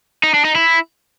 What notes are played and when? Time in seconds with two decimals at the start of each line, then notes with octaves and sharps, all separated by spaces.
0.23 D#4
0.34 D4
0.45 D#4
0.55 E4